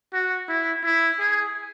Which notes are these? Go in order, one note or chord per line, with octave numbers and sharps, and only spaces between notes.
F#4
E4
E4
G#4